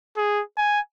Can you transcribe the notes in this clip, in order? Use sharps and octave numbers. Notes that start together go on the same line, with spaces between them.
G#4
G#5